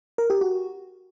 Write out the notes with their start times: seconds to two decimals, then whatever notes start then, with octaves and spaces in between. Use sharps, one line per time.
0.18 A#4
0.30 G4
0.41 F#4